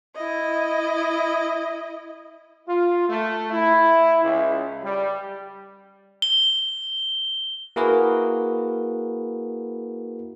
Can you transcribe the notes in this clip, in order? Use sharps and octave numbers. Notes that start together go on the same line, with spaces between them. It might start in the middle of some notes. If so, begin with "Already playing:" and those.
E4 D#5
F4
A3
E4
C#2
G3
G7
A#3 E4 F#4 G#4 A#4 B4